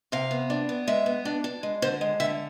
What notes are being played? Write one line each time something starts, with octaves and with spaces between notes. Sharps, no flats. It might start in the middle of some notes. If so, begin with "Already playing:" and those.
C3 F5
B3
D4
B3
G#3 E5
B3
D4
D4
G#3
D3 C5
G#3
D3 E5